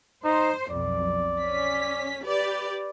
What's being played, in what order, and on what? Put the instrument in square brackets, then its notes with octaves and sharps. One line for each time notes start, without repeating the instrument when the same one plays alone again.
[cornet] D#4 [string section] C5
[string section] B1 F2 [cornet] D5
[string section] C#4 B6
G4 B4 D5